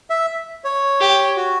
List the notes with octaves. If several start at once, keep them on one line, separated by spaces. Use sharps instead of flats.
E5
C#5
G4
F#4